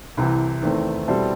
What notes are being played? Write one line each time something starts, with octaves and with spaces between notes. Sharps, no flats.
C2 C3 E3
E2 D#3 A3 C4
B2 G3 C4 E4 A4